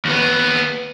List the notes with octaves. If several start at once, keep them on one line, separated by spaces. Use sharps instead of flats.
D#2 B3